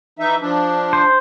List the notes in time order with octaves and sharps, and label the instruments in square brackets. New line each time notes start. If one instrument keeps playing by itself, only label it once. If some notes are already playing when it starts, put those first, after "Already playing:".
[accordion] E3 D#4 E5
F3 D4
[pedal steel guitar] C5